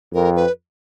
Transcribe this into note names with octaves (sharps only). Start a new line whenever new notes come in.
F2 A#4
B4